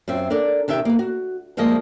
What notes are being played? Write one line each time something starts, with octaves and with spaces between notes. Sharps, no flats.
F#2 C4 F4 E5
D4 A4 A#4 D5
C3 D#3 G4 E5 G5
A#3 B3
F#4
D2 F3 G#3 A#3 F4 D#5